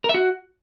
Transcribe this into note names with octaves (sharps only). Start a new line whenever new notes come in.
A#4
E5
F#4